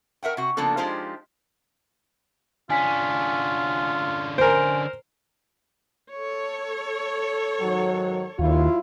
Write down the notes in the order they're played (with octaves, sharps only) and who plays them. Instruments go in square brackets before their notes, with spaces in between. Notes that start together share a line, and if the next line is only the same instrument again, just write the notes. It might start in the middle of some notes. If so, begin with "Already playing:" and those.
[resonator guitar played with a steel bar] A#4 E5 F#5 G5
C3 F#4
C#3 F3 A#3 B3 D4 A4
F3 G#3 D#4 F4 G4 C5
[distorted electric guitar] D3 C#4 [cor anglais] F4 [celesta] G#5 B6
[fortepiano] A#4 C5 [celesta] G#5 C6 D7
[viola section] A4 C#5
[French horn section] G#2 D#3 F#3
[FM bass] D#2 [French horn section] F#3 E4 F4